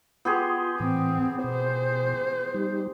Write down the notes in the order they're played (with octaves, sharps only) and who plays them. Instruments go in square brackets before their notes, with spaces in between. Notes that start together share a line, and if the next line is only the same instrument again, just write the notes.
[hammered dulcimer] B3 G4 G#4 [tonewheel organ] F4 C6
[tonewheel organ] A2 E3 [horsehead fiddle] C4
[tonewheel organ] B2 [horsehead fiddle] C5
[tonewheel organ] G3 D#4 G4